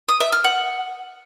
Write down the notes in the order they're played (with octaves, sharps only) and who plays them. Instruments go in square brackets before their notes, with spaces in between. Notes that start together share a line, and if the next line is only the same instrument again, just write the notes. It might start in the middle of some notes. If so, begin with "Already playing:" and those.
[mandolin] D#6
E5
F6
F#5